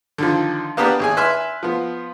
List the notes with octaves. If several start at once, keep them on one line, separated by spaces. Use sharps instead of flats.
D3 D#3 F3
A#3 B3 D4 G4 A#4 B4
G#1 G#4 G#5
B4 E5 G#5 C6 F6
F3 B3